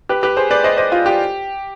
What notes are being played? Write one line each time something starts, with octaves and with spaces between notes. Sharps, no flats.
G4 B4
G4 B4
G#4 C5
B4 D5
C5 D#5
C5 D#5
F4
G4